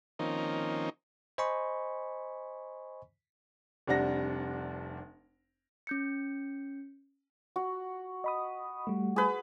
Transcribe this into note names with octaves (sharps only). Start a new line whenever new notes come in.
D#3 F3 A#3 C4 C#4 D#4
C5 D#5 G#5 B5 C#6
F1 C3 G3 D4 F#5 A#6
C#4 G6 C#7
F#4
D#5 B5 D#6
G3 A3
G#4 B4